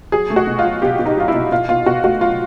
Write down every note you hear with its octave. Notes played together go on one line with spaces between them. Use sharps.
F#3 G#4
A3
F#4
B2
F4
F#3
B2 G4
B2
D#4
F#3 F4
E4
B2
B2 F4
B2 F4
B2 F#4
A3 F#4
F#3 F4